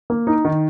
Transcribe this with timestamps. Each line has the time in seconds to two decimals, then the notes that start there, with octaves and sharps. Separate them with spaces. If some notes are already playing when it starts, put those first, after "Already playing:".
0.10 A#3
0.27 D#4
0.45 D#3